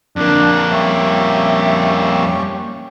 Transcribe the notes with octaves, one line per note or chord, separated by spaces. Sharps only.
F2 A#3 D4
G3 C#4 E5